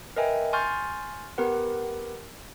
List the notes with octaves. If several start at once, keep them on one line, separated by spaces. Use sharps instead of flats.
A#4 B4 D#5 E5 G5 G#5
G#5 C6 C#6 F6 G6 A6
B3 G4 A#4 B4 F#5